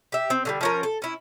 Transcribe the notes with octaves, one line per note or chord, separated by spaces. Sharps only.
G4 E5
C4
D3 F3 G3
F3 C#4 A#4
A4
C#4 E4